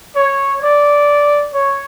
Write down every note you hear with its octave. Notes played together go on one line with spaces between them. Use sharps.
C#5
D5
C#5